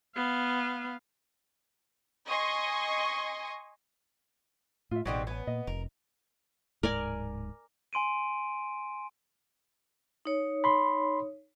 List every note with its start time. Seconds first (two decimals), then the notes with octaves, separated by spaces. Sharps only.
0.16 B3 F5
2.28 D#5 G#5 C6 C#6
4.91 A2 F4 E5
5.06 A1 B2 D3 C4 D#4 G4 G#4
5.27 B3 C#5 G#5
5.47 A#2 D#5
5.67 F1 A#4
6.83 D1 G#2 A#4 D5 G#5
7.93 G#5 C6 D7 D#7
10.25 D#4 C#5
10.64 B5 C6